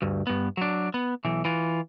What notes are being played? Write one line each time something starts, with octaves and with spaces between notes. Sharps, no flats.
D2 G2
G2 B3
F#3 D4
B3
B1 E3
E3 F4